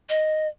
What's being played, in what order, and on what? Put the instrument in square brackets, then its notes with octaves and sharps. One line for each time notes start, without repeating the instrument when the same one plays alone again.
[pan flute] D#5